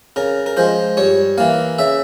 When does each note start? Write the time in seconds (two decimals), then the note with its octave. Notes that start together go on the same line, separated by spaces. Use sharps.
0.16 C#3 A#4
0.46 A#4
0.57 F3 G#3 C5
0.97 G2 C#5
1.38 E3 A#3 F5
1.78 C#3 E5